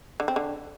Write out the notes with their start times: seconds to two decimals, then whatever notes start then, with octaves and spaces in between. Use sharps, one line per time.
0.20 D3
0.28 C4
0.36 D3